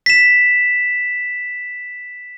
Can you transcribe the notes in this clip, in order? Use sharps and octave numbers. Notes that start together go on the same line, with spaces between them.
B6 E7